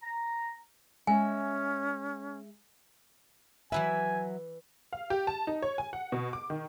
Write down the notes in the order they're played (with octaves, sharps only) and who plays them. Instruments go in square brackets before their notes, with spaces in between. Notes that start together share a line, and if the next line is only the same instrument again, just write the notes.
[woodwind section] A#5
[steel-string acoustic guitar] G#3 E5 [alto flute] C#4 [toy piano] G#5
[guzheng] E3 E4 B4 [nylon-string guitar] F#3 E5 [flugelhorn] G#5
[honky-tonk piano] F5
G4
A5
D#4
C#5
G#5
F#5
B2
D6
D#3